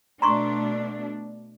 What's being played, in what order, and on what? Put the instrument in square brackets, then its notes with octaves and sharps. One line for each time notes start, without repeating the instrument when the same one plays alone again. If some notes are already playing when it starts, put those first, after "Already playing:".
[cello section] B2 A3 D4 [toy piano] A#5 C6 C#6